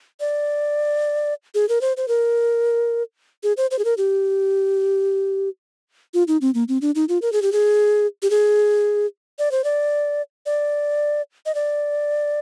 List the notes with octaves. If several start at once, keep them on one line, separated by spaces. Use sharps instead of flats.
D5
G#4
A#4
C5
C5
A#4
G#4
C5
C5
G#4
A#4
G4
F4
D#4
C4
A#3
C4
D4
D#4
F4
A#4
G#4
G4
G#4
G4
G#4
D5
C5
D5
D5
D#5
D5